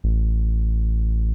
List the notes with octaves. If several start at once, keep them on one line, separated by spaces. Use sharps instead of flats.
A1